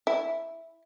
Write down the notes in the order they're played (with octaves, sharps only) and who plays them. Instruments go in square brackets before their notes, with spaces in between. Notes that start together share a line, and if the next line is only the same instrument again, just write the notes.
[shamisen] E4